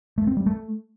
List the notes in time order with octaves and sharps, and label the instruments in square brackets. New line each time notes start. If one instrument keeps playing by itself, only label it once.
[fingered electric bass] A3
C4
G3
A3